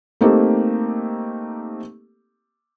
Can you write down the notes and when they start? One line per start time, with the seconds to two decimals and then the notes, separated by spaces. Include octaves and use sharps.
0.21 A3 A#3 C4 D#4 G4 A4